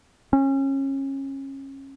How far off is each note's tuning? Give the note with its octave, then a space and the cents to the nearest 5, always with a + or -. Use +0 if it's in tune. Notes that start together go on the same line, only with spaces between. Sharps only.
C#4 -25